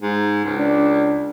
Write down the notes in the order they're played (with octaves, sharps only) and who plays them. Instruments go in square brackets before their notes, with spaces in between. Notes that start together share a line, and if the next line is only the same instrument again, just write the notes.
[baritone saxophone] G#2
C#2
[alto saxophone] D4